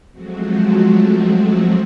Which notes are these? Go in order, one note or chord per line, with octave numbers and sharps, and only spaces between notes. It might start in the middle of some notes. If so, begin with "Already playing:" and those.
F3 F#3 G#3 A3 C4 F#4